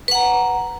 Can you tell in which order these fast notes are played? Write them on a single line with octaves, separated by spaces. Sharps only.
B4 F#5 A#5